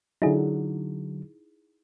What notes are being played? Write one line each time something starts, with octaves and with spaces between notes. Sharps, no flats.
D3 F#3 D#4 E4 G#4